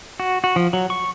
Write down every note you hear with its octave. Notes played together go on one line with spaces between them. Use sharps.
F#4
F#4
F3
F#3
C#6